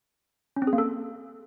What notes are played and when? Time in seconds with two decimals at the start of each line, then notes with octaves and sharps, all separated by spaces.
0.56 C#4
0.62 C4
0.67 G#4
0.73 A#3
0.78 A4